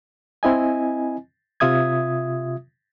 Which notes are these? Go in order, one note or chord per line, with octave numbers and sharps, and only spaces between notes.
C4 E4 D#5 G#5
C3 F4 E5 D#6 G#6